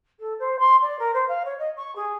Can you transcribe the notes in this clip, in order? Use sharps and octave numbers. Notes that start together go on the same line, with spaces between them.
A4
C5
C6
D5
A#4
C5
F5
C#5
D#5
C#6
G#4